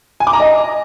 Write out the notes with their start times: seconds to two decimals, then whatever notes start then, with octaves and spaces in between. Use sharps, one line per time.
0.20 G#5
0.27 D6
0.33 A#5
0.40 D#5